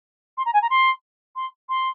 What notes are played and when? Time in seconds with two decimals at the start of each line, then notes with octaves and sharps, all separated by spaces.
0.37 C6
0.45 A#5
0.53 G#5
0.62 A#5
0.70 C6
1.35 C6
1.69 C6